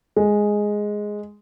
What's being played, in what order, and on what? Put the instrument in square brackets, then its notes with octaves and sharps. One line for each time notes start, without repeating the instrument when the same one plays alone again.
[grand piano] G#3